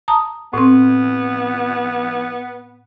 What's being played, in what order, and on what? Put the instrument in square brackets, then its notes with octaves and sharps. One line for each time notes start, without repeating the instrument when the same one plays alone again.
[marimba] A5 A#5 D#6
[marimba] A2 C4 [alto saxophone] B3